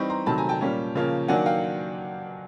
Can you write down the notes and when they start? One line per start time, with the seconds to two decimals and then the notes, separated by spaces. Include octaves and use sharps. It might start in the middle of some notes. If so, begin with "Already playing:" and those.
Already playing: E3 G3 C4 D#4 B5 C#6
0.09 A#5 C6
0.26 C3 D#3 F#3 A3 A5 B5
0.38 G#5 A#5
0.49 G5 A5
0.61 A#2 G3 A#3 C#4
0.95 C#3 F3 A#3 C#4
1.28 D#3 F#3 A#3 D4 F#5 G#5
1.46 F5 G5